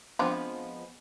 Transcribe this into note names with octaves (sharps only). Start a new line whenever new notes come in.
F3 G#3 B3 C4 D4 F4